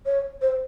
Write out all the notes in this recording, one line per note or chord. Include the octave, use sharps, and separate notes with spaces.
C#5
C5